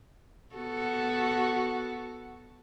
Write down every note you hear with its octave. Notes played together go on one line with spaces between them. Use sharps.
B3 F#4 A4